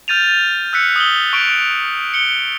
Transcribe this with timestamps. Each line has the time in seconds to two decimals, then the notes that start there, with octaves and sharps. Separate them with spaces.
0.08 F6 G6 A6 D#7 F7
0.73 E6 F#6 B6 C#7
0.96 D#6 F#7 G7
1.33 C#6 D7 F7
2.14 C#7 G7